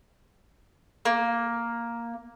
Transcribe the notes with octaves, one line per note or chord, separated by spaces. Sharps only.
A#3